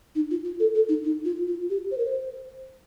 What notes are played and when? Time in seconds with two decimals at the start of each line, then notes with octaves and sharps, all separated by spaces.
0.15 D#4
0.31 F4
0.45 F4
0.60 A4
0.75 A4
0.89 D#4
1.04 D#4
1.25 F4
1.48 F4
1.70 G4
1.91 C5
1.98 A#4
2.06 C5